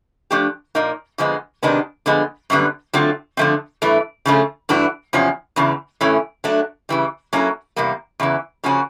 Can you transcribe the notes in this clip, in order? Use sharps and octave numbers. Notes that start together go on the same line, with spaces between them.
F3 A3 D4 G4
A#2 F3 A#3 D#4
F2 D3 F3 G#3 B3
C3 D#3 G#3 B3 D4
D3 F3 G#3 B3
F#2 D3 G3 B3
D3 F#3 A3 C4 F4
D3 F3 A3 C4
G2 E3 A3
C#3 F3 A3 C#4
G2 E3 A3 D4 F#4
E2 C3 F3 C#4
E2 C#3 E3
A2 E3 A3 C#4
F#3 A3 D4
C#3 E3 G3
F#3 A#3 C#4 E4 A4
E2 C3 G3 A#3
E2 C#3 E3
C#3 F3 A#3 C#4 F#4